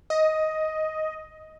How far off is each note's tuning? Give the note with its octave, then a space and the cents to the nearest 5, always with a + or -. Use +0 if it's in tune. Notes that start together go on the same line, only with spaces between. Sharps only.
D#5 +10